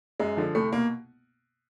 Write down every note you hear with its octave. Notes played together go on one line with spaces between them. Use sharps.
F#2 G#3
D3 F3
C2 A3
B2 A#3